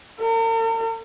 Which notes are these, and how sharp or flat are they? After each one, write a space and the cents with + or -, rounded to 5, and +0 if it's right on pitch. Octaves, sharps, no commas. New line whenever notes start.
A#4 -45